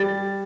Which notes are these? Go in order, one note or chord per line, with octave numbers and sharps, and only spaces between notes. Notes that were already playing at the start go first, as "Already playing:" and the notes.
Already playing: G3 A6